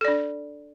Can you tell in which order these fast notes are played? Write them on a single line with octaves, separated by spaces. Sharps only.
A4 D5 D4